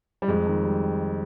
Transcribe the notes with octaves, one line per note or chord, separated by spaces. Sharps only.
G3
F2 G#3
D#3
G3